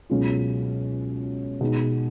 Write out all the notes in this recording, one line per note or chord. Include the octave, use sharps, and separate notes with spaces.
C#2 B2 F#3 C#4 F4
B2 G#3 D#4